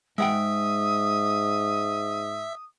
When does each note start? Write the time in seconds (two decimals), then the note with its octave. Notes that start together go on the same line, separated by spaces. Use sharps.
0.18 G#2 G#3 E5 F#5 G5 D#6